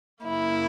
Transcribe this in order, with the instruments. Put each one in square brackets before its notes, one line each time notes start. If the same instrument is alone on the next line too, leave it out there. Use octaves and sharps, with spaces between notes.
[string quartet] F#2 C#3 F#3 A#3 E4